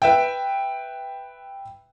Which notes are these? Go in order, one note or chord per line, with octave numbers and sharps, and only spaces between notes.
B4 E5 G5